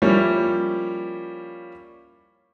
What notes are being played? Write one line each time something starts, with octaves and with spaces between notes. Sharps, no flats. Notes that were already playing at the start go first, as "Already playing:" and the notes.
F3 G3 A#3 C#4 E4